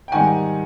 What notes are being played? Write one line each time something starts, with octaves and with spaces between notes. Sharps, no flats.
G5
G#2 D#3 G3 F#5 G#5